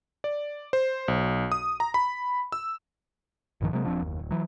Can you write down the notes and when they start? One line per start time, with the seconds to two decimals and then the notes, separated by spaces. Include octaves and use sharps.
0.24 D5
0.73 C5
1.08 B1
1.52 D#6
1.80 A#5
1.94 B5
2.52 E6
3.61 A#1 G2 D#3 F3
3.73 C3 F#3 G#3 A#3
3.85 D#1 F3 C4 D4
4.02 F#1 D#2
4.19 D1
4.31 E3 F#3